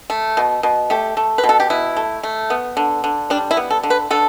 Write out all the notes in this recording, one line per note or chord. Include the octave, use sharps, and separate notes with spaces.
A3
B2
B2
A3 G4
A3
B4
B2
A4
G4
B2 E4
A3
A3
B3
D3
D3
G3 D4
E4
B3
A4
D3
B4
D3 A4